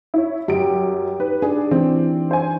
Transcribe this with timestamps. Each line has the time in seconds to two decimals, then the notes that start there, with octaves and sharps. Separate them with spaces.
0.14 E4 C#5
0.48 F#2 G4 D7
1.20 D#4 B4
1.42 D4 G#4 D5
1.71 E3 C4
2.31 C5 G#5